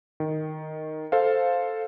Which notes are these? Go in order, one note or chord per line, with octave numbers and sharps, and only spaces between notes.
D#3
A4 C5 F5